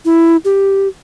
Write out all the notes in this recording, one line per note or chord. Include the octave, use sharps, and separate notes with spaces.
E4
G4